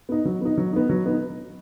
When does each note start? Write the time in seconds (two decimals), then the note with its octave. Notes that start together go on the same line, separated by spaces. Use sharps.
0.09 B3 D#4
0.25 F#3
0.41 B3 D#4
0.58 F#3
0.73 B3 D#4
0.89 F#3
1.05 B3 D#4